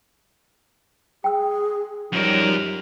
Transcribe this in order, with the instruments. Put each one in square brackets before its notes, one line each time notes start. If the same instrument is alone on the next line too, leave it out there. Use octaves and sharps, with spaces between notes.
[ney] G#4 [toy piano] G5 E6
[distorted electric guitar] F#2 A#4 [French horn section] F3 G3 D#4 [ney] C#5